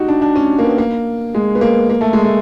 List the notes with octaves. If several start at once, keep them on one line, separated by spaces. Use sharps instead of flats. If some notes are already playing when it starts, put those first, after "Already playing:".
Already playing: D#4 F#4 G4
D4
D4
C#4
A#3
B3
A#3
G#3
B3
A#3
A#3
A3
G#3
A3